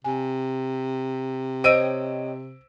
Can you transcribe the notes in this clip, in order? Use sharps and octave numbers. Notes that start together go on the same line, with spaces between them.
C3 G#5
C5 C#5 D#5 G5 E6 D7 D#7